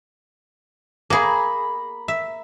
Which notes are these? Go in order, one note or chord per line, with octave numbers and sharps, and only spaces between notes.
A#3 G#4 A#5 B5
E5